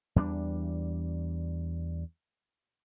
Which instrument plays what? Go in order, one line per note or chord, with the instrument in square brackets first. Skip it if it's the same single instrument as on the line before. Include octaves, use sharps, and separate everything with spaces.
[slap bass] E2 G2 G3 D4